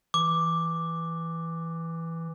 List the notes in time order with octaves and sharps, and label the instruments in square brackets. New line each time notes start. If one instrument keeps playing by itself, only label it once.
[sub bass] E3 [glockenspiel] D6